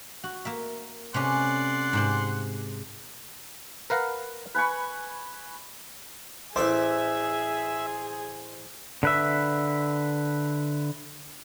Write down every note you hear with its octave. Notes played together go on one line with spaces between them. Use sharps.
F#4
A#3 A#4 E5
C3 A3 C#4 D5 F#5 C6
G#2 C3 C4
A#4 B4 F5 F#5 A#5
B4 G#5 B5 C#6
A1 G#4 A4 C5 D5 E5
D3 B4 E5